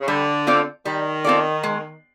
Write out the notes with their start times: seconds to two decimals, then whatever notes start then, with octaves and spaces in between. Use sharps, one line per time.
0.01 C#3
0.08 D3 G3
0.47 C4 F4 A4 D5
0.85 D#3 G3
1.24 C4 F4 A4 D5
1.63 G#3